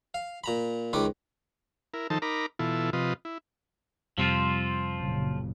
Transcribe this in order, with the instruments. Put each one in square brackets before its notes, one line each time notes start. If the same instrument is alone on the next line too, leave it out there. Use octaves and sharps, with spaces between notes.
[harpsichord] F5
A#2 A#5 B5
C#2 D#3 A#4 B4 D6
[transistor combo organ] E4 A#4
D#3 F3 D#4 A4 C5 A5
D#4 A#4 A#5 B5 D6
B2 E3 E4 F4 A4
C3 F3 F4 B4 D#5
E4
[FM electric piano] F2 C3 G3 [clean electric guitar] F3 C4 F4
[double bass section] F#1 A#2 C#3